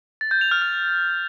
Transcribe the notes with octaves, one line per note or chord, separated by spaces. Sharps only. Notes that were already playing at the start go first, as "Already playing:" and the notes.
A6
G6
F7
F6
F6